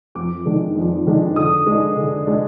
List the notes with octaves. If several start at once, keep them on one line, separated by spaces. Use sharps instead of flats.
F2 D6
D#3 G#3 D4
F2
D#3 G#3 D4
D3 D#6
G#3 D4
D3
G#3 D4